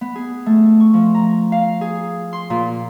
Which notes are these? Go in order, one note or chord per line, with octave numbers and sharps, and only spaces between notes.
B3
G#4
A3
C#6
F3
A#5
F5
G#4
C6
A#2